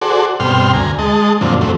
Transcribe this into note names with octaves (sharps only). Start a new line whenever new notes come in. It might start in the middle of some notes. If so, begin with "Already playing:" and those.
F#4 G#4 A4 C5 D5
G2 B2 C4 G5 C6 F6
D2 G#5 A#5
G#3 D#5 A5
F#2 A#2 D3 F3 C4
E2 F#3 A3 C4